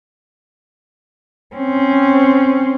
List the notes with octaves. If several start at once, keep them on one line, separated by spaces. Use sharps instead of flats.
C4 C#4